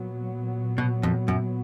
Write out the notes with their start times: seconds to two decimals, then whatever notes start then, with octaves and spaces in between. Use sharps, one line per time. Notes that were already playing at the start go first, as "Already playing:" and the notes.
Already playing: A#2 F#3 B3
0.78 B2
1.03 F2
1.28 F#2